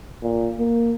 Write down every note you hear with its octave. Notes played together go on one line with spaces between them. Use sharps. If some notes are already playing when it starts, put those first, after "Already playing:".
A#2
A#3